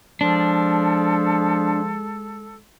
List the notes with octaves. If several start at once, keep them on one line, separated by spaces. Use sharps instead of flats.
F3 G#3 D4 A4